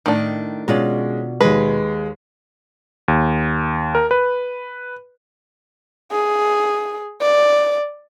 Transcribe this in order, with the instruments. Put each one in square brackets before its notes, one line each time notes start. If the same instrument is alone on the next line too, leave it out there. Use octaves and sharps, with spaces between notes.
[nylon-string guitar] A2 [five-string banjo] D#3 D4
[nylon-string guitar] B2 F4 D5 [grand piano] G#3 C#4
[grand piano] D#2 G#3 [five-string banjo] B4
[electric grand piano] D#2
A#4
B4
[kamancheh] G#4
D5